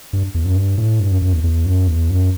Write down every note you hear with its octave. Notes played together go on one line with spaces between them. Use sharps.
G2
E2
F#2
G2
A2
G2
F#2
F#2
E2
E2
F#2
E2
F#2